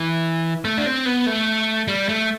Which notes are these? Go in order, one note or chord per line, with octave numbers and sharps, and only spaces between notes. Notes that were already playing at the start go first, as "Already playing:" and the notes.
Already playing: E3
A3
D4
C4
B3
A3
G3
A3